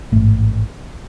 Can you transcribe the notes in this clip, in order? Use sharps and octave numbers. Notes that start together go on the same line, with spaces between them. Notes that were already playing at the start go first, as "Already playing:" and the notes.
A1 G#2 A3